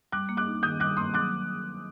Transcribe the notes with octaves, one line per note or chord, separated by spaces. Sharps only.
G3 D6 F#6
A#3
D6 F#6
D#4
D#3 D#6 G6
G3 D6 F#6
A#3 C6 D#6
F#3 D6 F#6